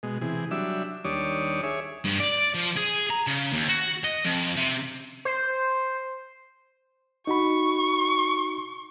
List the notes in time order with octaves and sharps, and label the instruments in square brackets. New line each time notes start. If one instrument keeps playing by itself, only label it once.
[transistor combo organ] B2 G#3
C3 E3 G#4
F#3 G3 D4 E5 E6
D#2 G3 D4 C#5 D6 D#6
G#4 C#5 E5
[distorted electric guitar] G2
D5
F3
G#4
A#5
C#3
D#2
F#4
D#5
F2
C3
[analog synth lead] C5
[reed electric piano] D#4 F#4 B5 [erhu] C#6